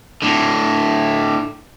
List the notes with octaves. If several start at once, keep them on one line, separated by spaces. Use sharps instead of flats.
A2 D3